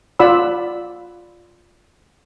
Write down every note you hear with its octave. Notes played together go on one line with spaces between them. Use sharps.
F4 D5 F#5 B5 E6